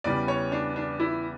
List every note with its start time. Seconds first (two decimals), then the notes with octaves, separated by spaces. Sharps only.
0.04 E2 C#3 E3 G3 D5
0.28 C#5
0.52 D4
0.76 D4
1.00 E4